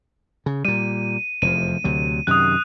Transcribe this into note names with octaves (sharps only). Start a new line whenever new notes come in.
C#3
A#2 G3 D#7
F1 E2 F3 D#7
D2 C3 F#3
F#2 C3 D#3 D#6 F#6